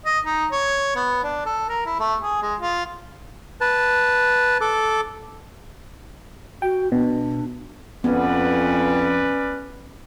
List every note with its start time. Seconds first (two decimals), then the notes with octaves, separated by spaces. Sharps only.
0.05 D#5
0.25 D#4
0.52 C#5
0.96 B3
1.24 D4
1.46 A4
1.69 A#4
1.86 E4
1.99 A3
2.21 G#4
2.42 G#3
2.60 F4
3.61 B4 A5
4.61 A4 D6
6.62 F#4 G5
6.92 B2 D4
8.04 F2 B3 C#4 B4 D5